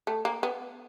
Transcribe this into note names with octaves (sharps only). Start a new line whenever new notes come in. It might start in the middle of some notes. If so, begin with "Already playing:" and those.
A3
A#3
B3